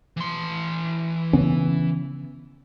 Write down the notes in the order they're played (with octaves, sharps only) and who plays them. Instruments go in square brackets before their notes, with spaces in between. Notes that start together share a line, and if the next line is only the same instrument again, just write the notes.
[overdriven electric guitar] E3 C6
[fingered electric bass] C#3 B3 C#4